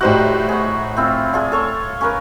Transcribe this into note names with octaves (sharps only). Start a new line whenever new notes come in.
A2 G3 D#4 F#4 C5 F#6
G#4 F#5
C4 E4 F4
D4 F4 G#4
A4 C#5 C#6
C#4 A#4 B4